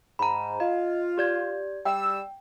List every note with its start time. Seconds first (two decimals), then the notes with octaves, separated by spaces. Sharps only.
0.19 G#2 A#5 B5
0.60 F4 D#5
1.18 G4 D5 G#6
1.85 G3 G5 E6